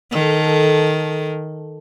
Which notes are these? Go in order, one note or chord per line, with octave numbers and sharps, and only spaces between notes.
D#3 A4